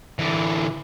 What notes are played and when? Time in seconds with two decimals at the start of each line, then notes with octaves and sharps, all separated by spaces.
0.19 D3 E3